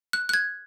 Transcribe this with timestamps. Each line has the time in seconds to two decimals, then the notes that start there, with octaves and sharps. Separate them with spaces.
0.13 F#6
0.29 F#6
0.34 G#6